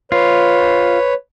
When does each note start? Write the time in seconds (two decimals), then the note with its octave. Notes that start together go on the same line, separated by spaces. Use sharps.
0.12 F4 B4 C#5